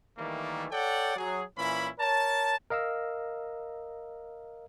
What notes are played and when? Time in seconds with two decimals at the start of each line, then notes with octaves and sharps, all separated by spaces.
0.17 D#3 E3 G3 A3 A#3
0.70 A4 C#5 D5 F#5 G5
1.16 F#3 G#4
1.56 A#2 E3 C#4 E4 B5
1.98 A#4 C#5 A5
2.70 A#4 D#5 F5 A#5 E6